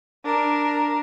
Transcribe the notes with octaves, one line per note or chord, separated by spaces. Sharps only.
D4 A#4